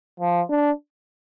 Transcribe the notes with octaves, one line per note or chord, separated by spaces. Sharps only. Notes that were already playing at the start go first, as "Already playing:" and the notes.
F3
D4